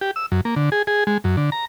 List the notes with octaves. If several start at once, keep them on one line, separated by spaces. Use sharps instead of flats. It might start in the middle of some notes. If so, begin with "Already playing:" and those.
G4
E6
F#2
A#3
D3
G#4
G#4
G#3
F#2
D3
A#5